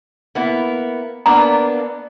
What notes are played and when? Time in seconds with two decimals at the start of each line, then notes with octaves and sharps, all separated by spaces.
0.35 A#3 B3 E4
1.26 A#3 B3 D4 A#5